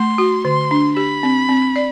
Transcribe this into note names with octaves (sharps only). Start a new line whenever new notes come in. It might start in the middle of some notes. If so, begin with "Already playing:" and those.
Already playing: A3 C6
F#4
D3 C6
D4
G4 B5
C4
C4
D5